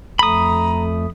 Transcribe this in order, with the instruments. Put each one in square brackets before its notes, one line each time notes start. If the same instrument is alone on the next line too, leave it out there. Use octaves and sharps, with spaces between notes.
[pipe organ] F2 A3 [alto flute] A#5 [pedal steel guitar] B5 D#6